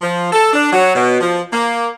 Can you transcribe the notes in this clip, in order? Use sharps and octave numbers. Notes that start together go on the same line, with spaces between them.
F3
A4
D4
F#3
B2
F3
A#3